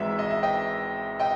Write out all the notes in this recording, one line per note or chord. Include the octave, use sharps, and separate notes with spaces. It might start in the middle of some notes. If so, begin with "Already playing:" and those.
Already playing: G#1 G#2 E3 E5
D#5
E5
D#5 G5
D#5 G5